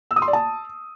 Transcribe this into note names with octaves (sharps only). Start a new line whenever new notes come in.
E6
D#6
C6
D5
A5